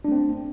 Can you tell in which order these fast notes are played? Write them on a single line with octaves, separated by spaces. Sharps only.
D4 A3 C4